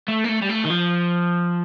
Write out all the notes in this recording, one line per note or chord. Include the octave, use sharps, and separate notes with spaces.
A3
A#3
A3
G3
A3
D#3
F3